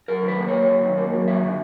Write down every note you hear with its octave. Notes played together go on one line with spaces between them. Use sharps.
F#2 A#4
D#3
B4
A#3
C#5
F#3
F#2
D#3
A#3
F#3
G2 E5
D3